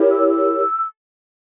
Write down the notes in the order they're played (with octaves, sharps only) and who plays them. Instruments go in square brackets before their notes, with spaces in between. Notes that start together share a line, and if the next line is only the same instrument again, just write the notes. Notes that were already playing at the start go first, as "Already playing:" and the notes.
Already playing: [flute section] E4 G4 A#4 C#5
E6
E6